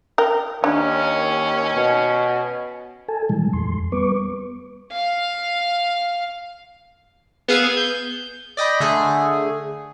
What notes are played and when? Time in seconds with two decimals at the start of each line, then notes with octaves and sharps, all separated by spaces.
0.18 A#4 G5
0.64 D#2 C#4 D4
1.75 B2
3.08 A4 G#5 A5
3.29 A#2 D#3 E3 G3 G#3
3.53 F2 C6
3.92 G3 B3 B4 C#6 D6
4.92 F5
7.48 B3 G#4 F5 E6 G#6
7.77 G6
8.57 D5 D#5 G5 B5
8.80 D3 A3 G#4